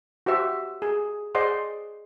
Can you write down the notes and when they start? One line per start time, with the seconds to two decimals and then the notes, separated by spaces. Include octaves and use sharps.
0.26 F#4 G4 C5 E5
0.82 G#4
1.35 G#4 C5 D5 D#5 F#5 C6